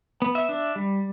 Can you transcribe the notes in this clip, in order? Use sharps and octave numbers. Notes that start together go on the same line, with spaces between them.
B3
E5
D4
G3